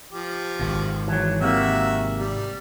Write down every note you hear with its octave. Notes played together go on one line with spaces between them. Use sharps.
F3 G4
G#1 B2
E3 F#3
C3 A#3 F#4 E5
G3